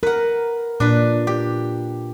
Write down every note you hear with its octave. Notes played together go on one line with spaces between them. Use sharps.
A#4 B4 F#5
A#2 D4 B4
G4